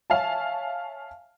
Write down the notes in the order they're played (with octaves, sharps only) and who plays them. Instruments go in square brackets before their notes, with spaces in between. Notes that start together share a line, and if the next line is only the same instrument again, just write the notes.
[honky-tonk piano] C#5 E5 F5 G#5 A5